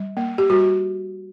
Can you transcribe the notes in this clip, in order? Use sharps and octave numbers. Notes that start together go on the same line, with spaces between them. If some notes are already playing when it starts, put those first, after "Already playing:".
Already playing: G3
A#3
G4
G3 F#4